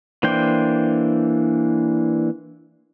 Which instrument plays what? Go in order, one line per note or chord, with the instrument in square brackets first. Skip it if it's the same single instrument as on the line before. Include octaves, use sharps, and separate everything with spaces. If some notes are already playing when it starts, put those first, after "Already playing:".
[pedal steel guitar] E3 A#3 D4 C5 G5